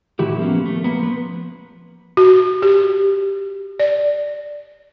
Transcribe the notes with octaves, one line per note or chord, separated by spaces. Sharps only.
A2 D#3 E4 F#4 G4
F3 A#3 B3 C#4
A3
A#3 B3
F3 B4
F#4
G4
D5